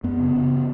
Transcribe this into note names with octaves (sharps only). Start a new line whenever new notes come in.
F#2 B3
C#3
C#3